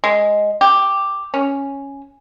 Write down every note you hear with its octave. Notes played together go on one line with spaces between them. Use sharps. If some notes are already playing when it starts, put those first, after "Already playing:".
G#3
G4
C#4